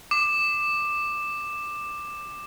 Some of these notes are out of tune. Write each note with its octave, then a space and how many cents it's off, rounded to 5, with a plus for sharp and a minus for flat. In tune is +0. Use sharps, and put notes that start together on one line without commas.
D6 +15